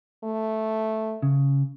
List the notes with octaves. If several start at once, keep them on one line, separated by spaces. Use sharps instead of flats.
A3
C#3